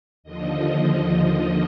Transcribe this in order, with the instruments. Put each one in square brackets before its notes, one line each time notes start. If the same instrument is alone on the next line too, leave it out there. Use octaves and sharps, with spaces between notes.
[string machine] D#2 D3 F3 D#5